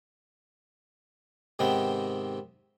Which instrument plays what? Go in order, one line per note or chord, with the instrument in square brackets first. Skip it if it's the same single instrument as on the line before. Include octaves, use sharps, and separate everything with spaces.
[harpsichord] G#2 C3 D#3 B3 C4 G5